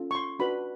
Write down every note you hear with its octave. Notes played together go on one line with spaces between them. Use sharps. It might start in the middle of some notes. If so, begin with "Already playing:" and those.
Already playing: C#4 F4 A4
C#6
C6
D4 F#4 B4 B5